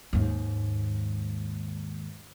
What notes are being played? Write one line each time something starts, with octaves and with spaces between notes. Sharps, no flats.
D#2 G#2